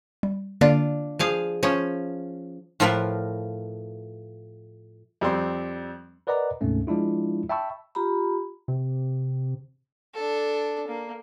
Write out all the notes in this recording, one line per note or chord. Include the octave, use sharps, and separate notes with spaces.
G3
D3 A#3 D4 F4 D5
F3 G#4 F5
F3 C#4
A2 F3 F4 A#4 B4 F5
F2 G3 C4 C6
A#4 B4 D5 D#5 F#5 A#5
D2 G#2 C3 A3 C4 C#4
F3 G#3 D4 E4 F4
E5 G5 A5 B5 C#6 E6
F4 G4 A#5 B5
C3
D4 A4
A#3